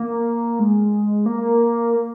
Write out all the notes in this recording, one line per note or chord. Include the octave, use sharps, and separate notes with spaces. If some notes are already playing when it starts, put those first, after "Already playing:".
Already playing: A#3
G#3
A#3